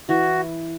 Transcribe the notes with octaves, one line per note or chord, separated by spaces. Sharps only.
E3 F#4